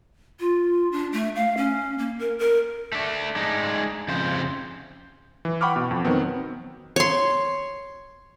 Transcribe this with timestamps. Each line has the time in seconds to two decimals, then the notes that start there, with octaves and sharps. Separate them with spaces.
0.40 F4
0.92 D4
1.12 A3
1.36 F5
1.57 C#4
1.98 A#3
2.19 A#4
2.39 A#4
2.92 A3 D4
3.36 G#3 D4 D#4
4.08 F2 C#3 C5
5.45 E3
5.61 F#5 G5 B5 C#6 D6 F6
5.76 B2
5.91 F2
6.05 D#3 F#3 B3 C4
6.96 C#5 C6